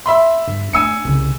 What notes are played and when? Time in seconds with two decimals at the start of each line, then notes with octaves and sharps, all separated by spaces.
0.06 E5 B5 C6
0.47 G2
0.73 A3 D4 G#5 E6 C#7
1.05 C2 C#3